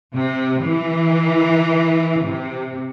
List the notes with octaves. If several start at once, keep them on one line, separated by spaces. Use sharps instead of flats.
C3
E3
C3